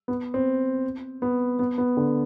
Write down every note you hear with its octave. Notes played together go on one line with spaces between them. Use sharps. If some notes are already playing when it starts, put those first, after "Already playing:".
B3
C4
B3
B3
B3
D3